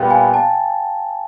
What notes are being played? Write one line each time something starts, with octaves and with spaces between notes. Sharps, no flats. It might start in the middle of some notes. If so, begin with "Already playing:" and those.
Already playing: A#2 G3 B3 F5 G5
G#5
A5